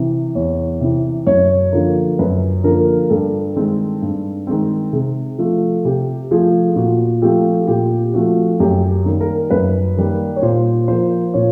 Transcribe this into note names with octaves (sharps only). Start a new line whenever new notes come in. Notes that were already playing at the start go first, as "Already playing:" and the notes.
Already playing: C3 E3
E2 C#5
C3 E3
F#2 C#5
D3 F3 A#3
F#2 B4
D3 F3 A#3 A#4
G2 A4
D#3 G#3 C4
G2
D#3 G#3 C4
C3 G#4
F3 A3
C3 G4
F3 A3 G#4
A#2 F#4
F3 A3 C4 G4
A#2 G4
F3 A3 C4 F#4
F#2 G4
D#3 G3 A#3
A#4
F#2 B4
D#3 G3 A#3
C#5
A#2 C5
F3 A#3 C5
A#2 C#5